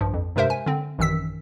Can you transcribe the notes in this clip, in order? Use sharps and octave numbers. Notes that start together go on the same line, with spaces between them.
A#1 G2 F3
F2
G2 C3 G#3 A#4 C5 E5
G#5
D3 C4
A1 F#2 D#3 E6 B6